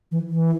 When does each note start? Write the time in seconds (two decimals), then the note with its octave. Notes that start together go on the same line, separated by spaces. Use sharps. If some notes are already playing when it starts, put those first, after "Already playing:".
0.12 E3
0.30 E3